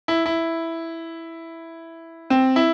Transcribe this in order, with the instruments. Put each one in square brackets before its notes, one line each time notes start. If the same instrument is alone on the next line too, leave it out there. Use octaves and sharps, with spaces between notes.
[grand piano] E4
E4
C4
E4